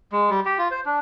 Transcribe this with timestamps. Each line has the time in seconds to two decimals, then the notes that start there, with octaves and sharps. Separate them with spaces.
0.12 G#3
0.30 G3
0.46 G4
0.59 F4
0.71 C5
0.86 D4